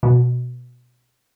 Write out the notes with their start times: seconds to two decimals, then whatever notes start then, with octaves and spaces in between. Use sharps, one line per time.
0.03 B2